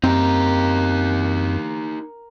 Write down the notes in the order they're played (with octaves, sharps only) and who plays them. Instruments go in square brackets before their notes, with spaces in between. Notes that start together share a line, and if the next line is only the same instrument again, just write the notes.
[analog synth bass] F#2 [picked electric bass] C4 [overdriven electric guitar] D#4 G4 [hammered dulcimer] A#4